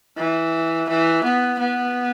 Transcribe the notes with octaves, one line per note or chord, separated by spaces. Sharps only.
E3
E3
B3
B3